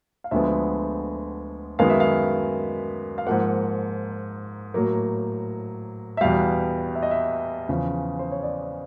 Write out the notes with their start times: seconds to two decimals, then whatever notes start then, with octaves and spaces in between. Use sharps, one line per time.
0.24 F5
0.31 D2 D3 F3 G#3 B3 E5
1.79 F#2 D#3 G#3 B3 F5
1.90 E5
2.00 F5
3.18 F5
3.27 G#2 F3 A#3 F#5
4.74 A2 F#3 A#3
6.17 E5
6.21 E2 B2 G3 F5
6.95 E5
7.03 D#5
7.11 E5
7.69 E2 C#3 F3
8.19 C5
8.32 C#5
8.43 D5